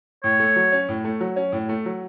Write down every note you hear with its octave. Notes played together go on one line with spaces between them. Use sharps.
A2 C#5
A3
F#3
C#4
A2
A3
F#3
C#4
A2
A3
F#3